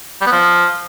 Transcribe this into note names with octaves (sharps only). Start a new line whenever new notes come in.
G3
B3
F3